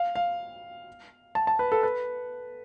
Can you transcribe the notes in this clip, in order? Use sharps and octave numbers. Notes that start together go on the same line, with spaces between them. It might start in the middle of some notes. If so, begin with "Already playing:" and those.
Already playing: F5
F5
A5
A5
B4
A4
B4